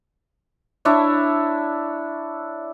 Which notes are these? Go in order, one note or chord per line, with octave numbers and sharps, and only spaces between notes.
D4 E4 C#5 E5